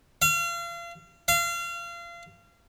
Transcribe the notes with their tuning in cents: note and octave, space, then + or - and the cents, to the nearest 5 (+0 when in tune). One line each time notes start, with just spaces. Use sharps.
F5 -35
F5 -30